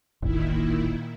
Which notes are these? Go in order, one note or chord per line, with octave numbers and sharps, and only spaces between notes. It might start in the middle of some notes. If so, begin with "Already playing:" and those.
E1 A1 A#2 D#3 E4